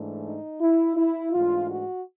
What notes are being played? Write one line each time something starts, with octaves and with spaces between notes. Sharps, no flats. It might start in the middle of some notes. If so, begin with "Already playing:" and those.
Already playing: G#2 E3 A3 D4
D#4
E4
E4
G#2 E3 A3 D4 F4
F#4